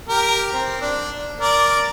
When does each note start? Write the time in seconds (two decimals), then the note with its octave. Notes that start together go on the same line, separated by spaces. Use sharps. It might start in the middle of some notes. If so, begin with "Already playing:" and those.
0.09 G4 A#4
0.53 C4
0.81 D4
1.39 A#4 D5